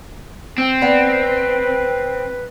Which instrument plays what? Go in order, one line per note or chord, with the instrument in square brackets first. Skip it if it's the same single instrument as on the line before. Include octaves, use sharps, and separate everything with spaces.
[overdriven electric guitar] C4
[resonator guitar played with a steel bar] B3 D5 F#5 [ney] B4